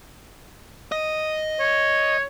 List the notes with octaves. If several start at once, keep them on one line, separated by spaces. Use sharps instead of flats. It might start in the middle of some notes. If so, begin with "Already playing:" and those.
D#5
C#5